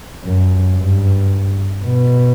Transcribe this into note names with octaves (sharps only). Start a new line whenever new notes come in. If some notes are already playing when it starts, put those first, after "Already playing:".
F#2
G2
B2